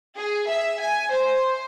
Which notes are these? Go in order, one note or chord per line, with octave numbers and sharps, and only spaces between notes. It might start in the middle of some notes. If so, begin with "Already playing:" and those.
G#4
E5
G#5
C5